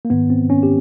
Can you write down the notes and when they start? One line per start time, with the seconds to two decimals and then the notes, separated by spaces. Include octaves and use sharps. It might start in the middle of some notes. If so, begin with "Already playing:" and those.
0.05 A#3
0.10 G#2 D#3 B3
0.30 C4
0.50 C#4
0.63 G4